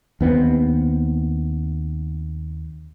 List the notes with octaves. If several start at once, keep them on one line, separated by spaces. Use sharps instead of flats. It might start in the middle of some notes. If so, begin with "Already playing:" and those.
D#2 B3 C4